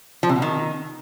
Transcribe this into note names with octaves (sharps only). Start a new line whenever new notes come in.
F3
C3
B2
D#3